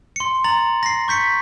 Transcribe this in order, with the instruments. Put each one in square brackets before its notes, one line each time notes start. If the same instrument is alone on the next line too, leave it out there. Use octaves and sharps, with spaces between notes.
[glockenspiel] C6 C#7
A#5 A6 F#7
A#6 C7
C#6 G6 B6 C#7